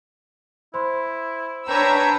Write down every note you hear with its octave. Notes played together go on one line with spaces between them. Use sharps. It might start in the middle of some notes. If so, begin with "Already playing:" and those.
E4 C5 B5 C6
D4 B4 C#5 G5 A#5 E6